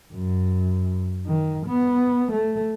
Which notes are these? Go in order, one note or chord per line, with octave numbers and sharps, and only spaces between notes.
F#2
D#3
B3
A3